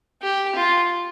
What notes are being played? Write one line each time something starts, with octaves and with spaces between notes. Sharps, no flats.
G4
F4